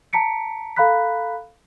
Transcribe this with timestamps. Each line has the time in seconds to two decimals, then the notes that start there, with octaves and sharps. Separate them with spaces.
0.13 A5 A#5 B6 C#7 D7
0.76 A4 F5 A#5 B5 F#6 B6